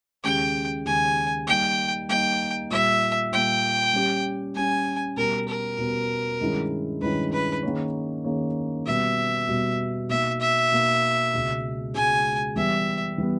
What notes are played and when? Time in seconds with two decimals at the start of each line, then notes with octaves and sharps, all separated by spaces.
0.24 D#2 C#3 G#3 C#4 G4 G5
0.85 D#2 C#3 G#3 C#4 G4 G#5
1.47 G3 A#3 D#4 G5
2.09 G3 A#3 D#4 G5
2.70 A#2 G3 A#3 E5
3.32 A#2 G3 A#3 G5
3.93 G3 C#4 G4
4.55 G3 C#4 G4 G#5
5.17 B2 G3 B3 G4 A#4
5.48 A#4
5.79 B2 G3 B3 G4
6.41 G2 D#3 G#3 C#4 E4
7.02 G2 D#3 G#3 C#4 E4 B4
7.33 B4
7.63 D#3 A#3 C#4 G#4 C#5
8.24 D#3 A#3 C#4 G#4 C#5
8.87 B2 G3 B3 E5
9.48 B2 G3 B3
10.09 B2 A#3 D#4 E5
10.41 E5
10.72 B2 A#3 D#4
11.34 C#2 B2 G#3
11.94 C#2 B2 G#3 G#5
12.56 E3 G3 B3 E5
13.18 E3 G3 B3